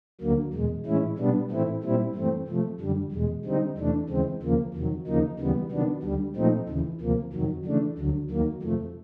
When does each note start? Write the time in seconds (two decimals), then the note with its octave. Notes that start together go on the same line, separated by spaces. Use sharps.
0.21 D2 D3 F#3 A#3
0.53 E2 B2 G#3
0.85 A2 E3 G#3 C#4 E4
1.18 B2 G3 B3 D4
1.50 A2 E3 A3 C4 E4
1.83 A#2 G3 C4 E4
2.15 G2 E3 A3 C4
2.47 C3 F3 A3
2.80 F#2 D3 G3
3.12 E2 B2 G#3
3.45 D3 G3 C4 D#4
3.77 E2 C3 E3 A3 D4
4.09 D#2 C#3 E3 G#3 C4
4.42 D#2 C#3 F3 A#3
4.74 E2 C3 D#3 F#3
5.07 D#2 C#3 F3 A#3 D#4
5.39 D#2 C#3 E3 G3 B3
5.71 C3 D#3 F#3 B3 D4
6.03 D2 D3 G3
6.36 A#2 F3 A3 C4 D#4
6.68 D#2 C#3 E3
7.01 D2 C3 F3 A#3
7.33 F2 C3 D#3 F#3
7.65 C#3 E3 A3 D4
7.98 D2 D3 F#3
8.30 D#2 D#3 F#3 A#3
8.62 F2 C3 F3 A3